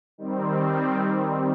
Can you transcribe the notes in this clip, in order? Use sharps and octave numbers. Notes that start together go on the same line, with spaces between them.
D#3 G3 C4